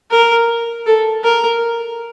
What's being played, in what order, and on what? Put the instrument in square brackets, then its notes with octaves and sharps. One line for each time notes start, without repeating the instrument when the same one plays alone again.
[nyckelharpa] A#4
A4
A#4